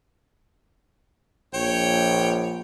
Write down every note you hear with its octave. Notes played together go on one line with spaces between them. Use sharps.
A#1 C#5 G5